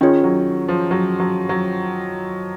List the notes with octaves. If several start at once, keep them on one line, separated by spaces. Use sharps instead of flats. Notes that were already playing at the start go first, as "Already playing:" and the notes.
D#3 C#4 F4 G#4 C#5
F#3
F3
F#3
F#3
F#3